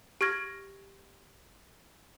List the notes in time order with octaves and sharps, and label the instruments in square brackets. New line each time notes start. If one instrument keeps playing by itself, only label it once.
[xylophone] G4 C#6 F6 G#6 A#6